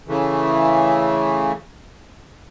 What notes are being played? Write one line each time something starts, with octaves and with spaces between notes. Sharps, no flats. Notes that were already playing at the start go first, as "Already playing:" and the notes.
C#3 E3 A3